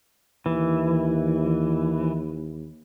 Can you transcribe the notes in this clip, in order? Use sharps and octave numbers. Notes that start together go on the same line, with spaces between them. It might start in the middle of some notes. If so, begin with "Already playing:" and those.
D#2 E3